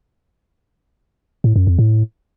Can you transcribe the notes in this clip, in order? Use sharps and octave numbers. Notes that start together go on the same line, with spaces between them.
A2
F#2
F2
A2